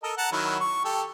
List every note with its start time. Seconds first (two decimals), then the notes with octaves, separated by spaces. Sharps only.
0.03 A4 A#4 D#5
0.17 F#5 A5 A#5
0.32 D#3 F#3 E4
0.60 C#6
0.85 G4 A4